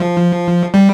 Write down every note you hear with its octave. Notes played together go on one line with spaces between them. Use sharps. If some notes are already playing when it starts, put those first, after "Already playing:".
Already playing: F3
G3